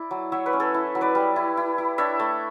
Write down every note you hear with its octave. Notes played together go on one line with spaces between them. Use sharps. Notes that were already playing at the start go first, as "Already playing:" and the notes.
Already playing: E4 D5
F#3
F#3 C#5 E5
B4 D5
C#4
A4 C#5
E4
F#3
B4 D5
G3
E4
E4
E4
D4 C#5 E5
A3